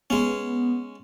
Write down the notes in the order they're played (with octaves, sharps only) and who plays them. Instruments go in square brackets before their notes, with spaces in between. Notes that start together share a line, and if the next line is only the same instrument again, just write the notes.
[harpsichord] G#3 C#4 [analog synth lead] B3